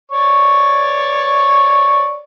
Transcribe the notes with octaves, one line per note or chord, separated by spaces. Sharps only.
C#5 D5 C#6